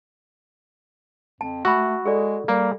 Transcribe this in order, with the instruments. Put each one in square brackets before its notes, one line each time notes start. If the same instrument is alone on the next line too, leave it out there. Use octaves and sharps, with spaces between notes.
[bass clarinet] F2 [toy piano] A5
[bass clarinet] A3 [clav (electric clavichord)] F#4 [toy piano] B5 E6
[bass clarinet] G#3 [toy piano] G#4 A4 D5
[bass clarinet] G3 [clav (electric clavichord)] A#3